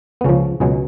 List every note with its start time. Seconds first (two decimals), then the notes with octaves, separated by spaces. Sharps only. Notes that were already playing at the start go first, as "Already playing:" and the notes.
0.21 B3
0.24 C#2 C#3 F3 C#4
0.60 C#2 B2 F#3 G#3 G#4